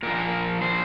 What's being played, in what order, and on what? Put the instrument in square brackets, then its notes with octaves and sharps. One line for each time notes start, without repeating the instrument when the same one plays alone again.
[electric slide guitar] A#2 F3 A#4
A#2 F3 C5